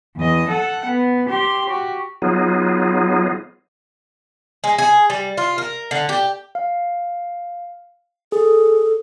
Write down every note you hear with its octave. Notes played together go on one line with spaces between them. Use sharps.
E2 D#5
A4 F#5
B3
G4 C6
F#4 G4
F#3 B3 D#4 F4 G#4
G#3
G#4
G3
F4
A#4
D3
G4
F5
G#4 A4